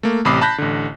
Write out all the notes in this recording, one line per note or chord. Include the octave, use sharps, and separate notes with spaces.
A3 A#3
A1 C3 B5 D6 D#6 C7
A5 B5 F#6 G6 A#6 B6
A1 D3